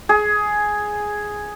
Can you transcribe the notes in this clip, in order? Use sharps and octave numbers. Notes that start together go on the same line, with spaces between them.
G#4